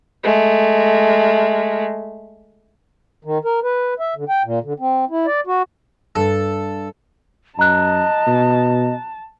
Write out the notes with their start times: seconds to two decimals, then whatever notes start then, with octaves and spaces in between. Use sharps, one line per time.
0.24 G#3 A3
3.25 D#3
3.45 A#4
3.63 B4
4.00 E5
4.16 D3
4.29 G5
4.45 A#2
4.63 D3
4.80 C4
5.10 E4
5.26 D5
5.47 F#4
6.15 G2 A4
7.59 F#2 D#5 A5 A#5 F#6
8.27 B2